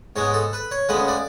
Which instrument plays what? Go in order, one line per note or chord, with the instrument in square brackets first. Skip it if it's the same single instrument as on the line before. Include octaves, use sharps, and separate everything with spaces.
[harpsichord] G#2 G#3 B3 C#5
A4
B4
C#5
D2 C#3 G#3 B3 B4
D5